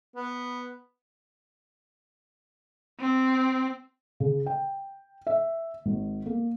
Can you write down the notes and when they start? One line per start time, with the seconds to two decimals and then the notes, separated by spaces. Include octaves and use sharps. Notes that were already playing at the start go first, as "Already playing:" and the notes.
0.16 B3
3.00 C4
4.20 C#3
4.46 G5
5.27 E5
5.86 G#1
6.26 A#3